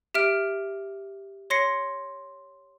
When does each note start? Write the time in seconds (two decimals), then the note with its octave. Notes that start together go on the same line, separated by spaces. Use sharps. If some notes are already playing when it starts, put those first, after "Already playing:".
0.15 G4 E5 F6 D7
1.50 C#5 C6 A#6 C7 C#7